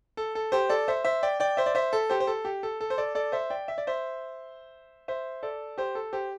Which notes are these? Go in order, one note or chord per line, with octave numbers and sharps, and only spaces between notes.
A4
A4
G4 C5
A4 D5
C5 E5
C5 E5
D5 G5
D5 G5
C5 E5
D5
C5 E5
A4
G4 C5
C5
A4
G4
A4
A4
C5
A4 D5
A4 D5
C5 E5
D5 G5
E5
D5
C5 E5
C5 E5
A4 D5
G4 C5
A4
G4 C5